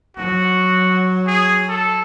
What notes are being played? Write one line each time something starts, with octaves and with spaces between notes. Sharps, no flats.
F#3 F#4
G#4
A4